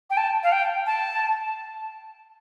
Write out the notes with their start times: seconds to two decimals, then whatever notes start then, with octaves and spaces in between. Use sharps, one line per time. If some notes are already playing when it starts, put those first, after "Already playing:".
0.10 G5
0.17 A5
0.43 F5
0.52 G5
0.86 A5